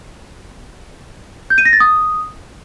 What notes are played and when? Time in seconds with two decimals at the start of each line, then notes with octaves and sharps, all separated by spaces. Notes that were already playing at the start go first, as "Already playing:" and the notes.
1.50 G6
1.58 D#7
1.65 A#6
1.73 A6
1.80 D#6